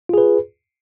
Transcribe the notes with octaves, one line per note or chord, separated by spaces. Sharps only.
F4 G#4 B4